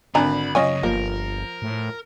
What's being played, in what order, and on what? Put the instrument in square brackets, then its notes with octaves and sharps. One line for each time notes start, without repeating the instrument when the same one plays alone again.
[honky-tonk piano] G#1 D3 [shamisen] D4 G#5 A#5 [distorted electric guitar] B5
[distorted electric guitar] F#2 C#3 [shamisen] C#4 F4 G#5 [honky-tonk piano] C#5 D#5
[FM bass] G1 [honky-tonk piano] F3 [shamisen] A#3 [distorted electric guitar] A#4
[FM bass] A2